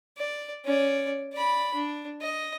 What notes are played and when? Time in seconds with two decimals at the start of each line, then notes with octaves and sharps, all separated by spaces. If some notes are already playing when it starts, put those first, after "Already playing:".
0.17 D5
0.65 C#4 D5
1.34 D5 B5
1.75 D4
2.22 D#5